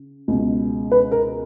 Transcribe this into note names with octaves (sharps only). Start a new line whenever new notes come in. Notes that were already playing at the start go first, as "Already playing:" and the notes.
Already playing: C#3
C#2 B2
B4
A#4